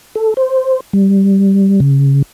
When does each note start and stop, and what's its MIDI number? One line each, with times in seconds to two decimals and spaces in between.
0.15 0.34 69
0.37 0.80 72
0.93 1.80 55
1.80 2.22 49